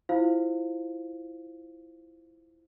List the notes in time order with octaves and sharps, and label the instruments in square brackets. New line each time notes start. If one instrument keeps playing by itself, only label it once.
[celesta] E4 F4 C5 F5